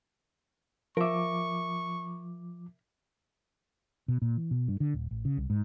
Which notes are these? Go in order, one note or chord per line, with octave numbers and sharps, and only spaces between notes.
F3 A#4 E5 C#6 D6
B2
A#2
E3
B2
G2
D3
D#1
A1
C#3
C2
G#2